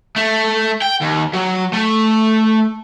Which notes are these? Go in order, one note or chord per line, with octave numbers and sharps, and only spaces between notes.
A3
G5
D#2
F#3
A3